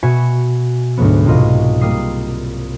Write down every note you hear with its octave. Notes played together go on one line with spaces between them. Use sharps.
B2 F#4 E5 G#5 B5 C#7
D2 G#2 F#3 A3 B3
C2 B2 F4 D#5
G3 A#3 D#6 C7